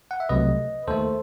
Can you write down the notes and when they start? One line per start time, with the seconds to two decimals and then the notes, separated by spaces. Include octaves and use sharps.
0.11 F#5
0.20 E5
0.29 C2 C3 F#3 A3 B4 D#5
0.88 D#2 D#3 A3 A4 C5